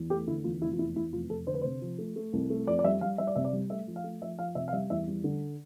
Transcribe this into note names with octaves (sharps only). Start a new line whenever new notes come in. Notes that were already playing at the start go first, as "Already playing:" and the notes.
Already playing: E2
A3 G4
D3 E4
E2 F4
F1 E4
F4
E2 E4
E2 E4
F1 F4
F1 A4
D3 C5
B4
C3 C5
F3
A3
A3
C2
A3
F2 D5
D5
G3 E5
G3 F5
G3 E5
D5
C3 E5
D5
G3
A3 E5
F3
F5
A3
F3 E5
F3 F5
C3 E5
F5
G3 E5
E2 E5
G3
D3